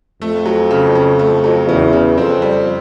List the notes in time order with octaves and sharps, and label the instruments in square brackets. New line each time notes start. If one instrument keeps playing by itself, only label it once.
[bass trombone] F2 [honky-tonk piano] A3
[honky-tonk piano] F#3
C#3
C#3
A3
F#3
[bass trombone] E2 [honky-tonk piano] C#3
[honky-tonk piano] C#3
[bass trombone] F2 [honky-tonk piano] C4
[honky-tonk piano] G3